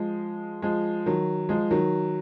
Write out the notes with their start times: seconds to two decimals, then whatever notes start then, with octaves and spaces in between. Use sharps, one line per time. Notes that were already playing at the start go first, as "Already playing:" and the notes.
Already playing: F3 G#3
0.62 F3 G#3
1.06 D#3 F#3
1.49 F3 G#3
1.71 D#3 F#3